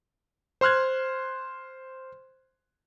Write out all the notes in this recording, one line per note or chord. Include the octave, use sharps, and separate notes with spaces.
C5 C6 F6 F#6 G#6